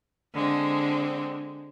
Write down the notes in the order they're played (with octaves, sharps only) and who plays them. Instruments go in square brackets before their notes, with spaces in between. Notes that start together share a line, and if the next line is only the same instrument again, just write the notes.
[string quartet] D3 G#3 C4